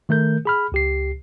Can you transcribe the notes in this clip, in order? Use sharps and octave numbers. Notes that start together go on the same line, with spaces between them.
D#3 A3 A#4 G6
G#4 B5 F6
C#2 G4 C7